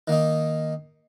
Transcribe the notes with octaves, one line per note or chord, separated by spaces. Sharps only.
D#3 A#3 D#4